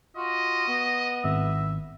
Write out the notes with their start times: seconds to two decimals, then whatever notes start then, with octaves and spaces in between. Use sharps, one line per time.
0.17 F4 F#4 D#5
0.68 B3
1.24 G#1 E5